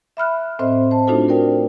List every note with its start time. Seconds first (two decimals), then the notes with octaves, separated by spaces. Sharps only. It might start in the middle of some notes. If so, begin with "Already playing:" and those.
0.17 E5 B5 F6 F#6
0.59 A2 C4 C5 D#5 E5
0.91 C5 A5
1.07 A3 D4 D#4 F4 F#4 A4
1.28 A#4 C5 D5 G5